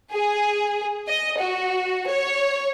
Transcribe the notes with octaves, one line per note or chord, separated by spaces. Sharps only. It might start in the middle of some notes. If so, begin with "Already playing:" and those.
G#4
D#5
F#4
C#5